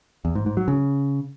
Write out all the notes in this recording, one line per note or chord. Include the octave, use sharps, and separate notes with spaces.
E2
G#2
G#2
F#3
C#3